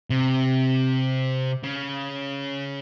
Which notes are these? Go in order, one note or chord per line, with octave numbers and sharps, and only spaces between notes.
C3
C#3